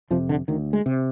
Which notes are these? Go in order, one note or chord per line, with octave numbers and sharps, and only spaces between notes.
F2 C3 F3
D3
D2 D#3
G#3
C3